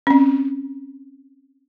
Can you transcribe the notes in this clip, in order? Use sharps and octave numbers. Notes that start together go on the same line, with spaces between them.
C4 C#4